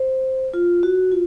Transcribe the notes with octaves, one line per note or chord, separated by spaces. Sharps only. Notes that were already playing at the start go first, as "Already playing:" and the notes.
Already playing: C5
F4
F#4
F4